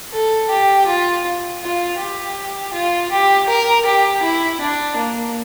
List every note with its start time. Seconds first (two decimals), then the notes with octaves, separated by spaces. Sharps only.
0.13 A4
0.50 G4
0.87 F4
1.61 F4
1.99 G4
2.73 F4
3.11 G4
3.48 A#4
3.86 G4
4.23 E4
4.60 D4
4.97 A#3